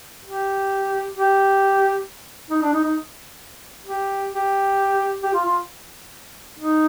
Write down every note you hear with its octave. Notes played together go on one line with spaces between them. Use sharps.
G4
G4
D#4
D4
D#4
D#4
G4
G4
G4
F4
F4
D#4